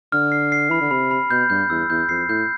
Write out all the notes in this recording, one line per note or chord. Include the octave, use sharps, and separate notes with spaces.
D3 F6
C7
C7
E3 B5
D3
C3 B5
B5
B2 G6
G2 G6
E2 E6
E2 G6
F2 C7
A2 G6